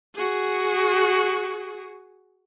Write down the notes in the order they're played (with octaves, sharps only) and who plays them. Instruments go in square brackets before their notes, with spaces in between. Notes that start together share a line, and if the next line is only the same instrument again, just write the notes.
[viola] F#4 G#4